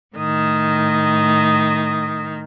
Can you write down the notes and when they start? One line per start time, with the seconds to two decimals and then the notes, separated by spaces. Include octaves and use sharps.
0.17 A2 D#3 D#6